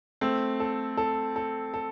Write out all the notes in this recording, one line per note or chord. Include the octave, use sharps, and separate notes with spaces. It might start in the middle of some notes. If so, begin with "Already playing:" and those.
A3 C4
A4
A4
A4
A4